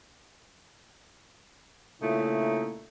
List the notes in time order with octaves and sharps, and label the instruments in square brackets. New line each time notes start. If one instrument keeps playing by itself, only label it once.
[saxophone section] A#2 C#3 A3 D#4 E4